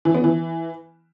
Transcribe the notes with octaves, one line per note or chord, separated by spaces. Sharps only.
E3
B3
E3